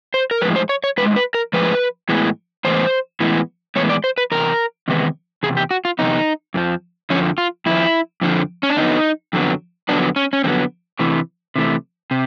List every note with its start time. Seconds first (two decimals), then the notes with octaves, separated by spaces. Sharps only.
0.14 C5
0.31 A#4
0.41 A2 F3 G#3 B4
0.56 C5
0.69 C#5
0.84 C#5
0.98 A2 F3 B4
1.02 G#3
1.16 B4
1.34 A#4
1.53 A2 F3 G#3 B4
2.09 A2 E3 G#3 B3
2.65 A2 E3 G#3 B3 C5
3.20 A2 E3 G#3 B3
3.76 A2 E3 G#3 B3 C#5
3.90 D5
4.04 C5
4.18 B4
4.31 E2 C3 A#4
4.88 E2 C3 D#3 G#3 B3
5.43 E2 C3 G#4
5.57 G4
5.71 F#4
5.85 F4
5.99 E2 C3 B3 D#4
6.54 F2 D3 F3
7.10 F2 D3 F3 C#4
7.38 F4
7.66 F2 D3 F3 E4
8.21 F2 D3 F3
8.63 C#4
8.70 D4
8.77 F2 D3 F#3 B3 D#4
9.33 F2 D3 F#3 B3
9.89 F2 D3 F#3 B3 D4
10.16 C#4
10.33 C#4
10.44 F2 D3 F#3 B3 C4
10.99 C3 E3 A3
11.55 C3 E3 A3
12.11 C3